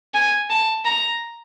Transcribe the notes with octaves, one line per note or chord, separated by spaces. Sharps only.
G#5
A5
A#5